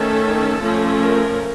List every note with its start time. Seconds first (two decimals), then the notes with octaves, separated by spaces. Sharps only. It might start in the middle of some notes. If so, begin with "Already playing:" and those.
Already playing: D#3 A3 C#4 A4
0.62 F3 A3 C#4
1.01 A#4